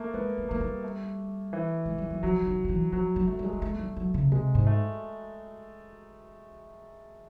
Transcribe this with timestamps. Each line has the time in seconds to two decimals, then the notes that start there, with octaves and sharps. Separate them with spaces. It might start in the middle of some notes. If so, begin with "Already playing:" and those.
Already playing: A3 A#3
0.14 G#3 B3
0.38 G#3
0.49 G#3 A#3
0.60 G3
0.84 A3
1.53 E3
1.86 G#3
1.98 G3
2.10 F#3
2.23 F3 F#3
2.42 E3
2.47 D#3
2.65 F3
2.69 E3
2.92 F3 F#3
3.16 F#3
3.27 G#3 A3
3.39 G3
3.44 G#3
3.53 G3
3.62 G#3 A3
3.79 G3
3.96 F#3
4.14 C#3
4.32 C3 G#3
4.55 G#2
4.66 A3